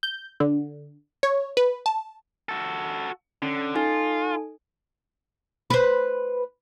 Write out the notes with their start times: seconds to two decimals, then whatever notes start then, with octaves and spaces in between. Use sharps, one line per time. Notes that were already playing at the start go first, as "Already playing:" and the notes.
0.03 G6
0.40 D3
1.23 C#5
1.57 B4
1.86 A5
2.49 F#4 A4
3.42 D3 C#4
3.75 D#4 F4 A4 G#5
5.70 B4 C5